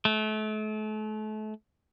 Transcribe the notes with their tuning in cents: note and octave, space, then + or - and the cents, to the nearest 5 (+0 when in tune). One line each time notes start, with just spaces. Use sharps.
A3 -35